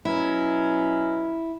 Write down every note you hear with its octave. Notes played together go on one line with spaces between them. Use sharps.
B2 F#3 C#4 E4